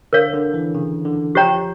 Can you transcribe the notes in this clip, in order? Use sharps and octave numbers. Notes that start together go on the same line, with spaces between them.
D3 A#4 C#5 F5
D3
E3
C#3
D3
F3 G4 C#5 G5 A#5